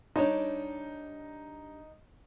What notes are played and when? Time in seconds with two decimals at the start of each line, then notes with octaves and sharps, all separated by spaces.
0.16 G3 D4 D#4 C#5